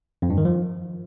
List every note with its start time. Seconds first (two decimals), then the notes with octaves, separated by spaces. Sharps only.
0.22 F2
0.30 G2
0.37 D#3
0.45 F3